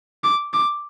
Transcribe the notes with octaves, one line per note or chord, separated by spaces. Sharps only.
D6
D6